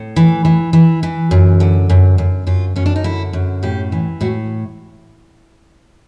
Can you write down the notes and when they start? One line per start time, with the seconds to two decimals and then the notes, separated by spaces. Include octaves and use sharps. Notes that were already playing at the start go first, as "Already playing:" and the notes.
Already playing: A2
0.16 E3
0.45 E3
0.73 E3
1.03 E3
1.31 F#2
1.60 D3
1.90 F#2
2.18 F#2
2.47 F#2 F4
2.76 F#2 C#4
2.86 D4
2.96 D#4
3.04 D3 E4
3.33 F#2
3.63 A2 G4
3.92 E3
4.21 A2 F#4